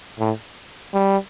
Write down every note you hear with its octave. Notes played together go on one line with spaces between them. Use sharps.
A2
G3